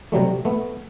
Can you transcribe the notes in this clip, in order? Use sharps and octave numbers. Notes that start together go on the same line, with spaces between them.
C3 F#3 G3 A3
A3 B3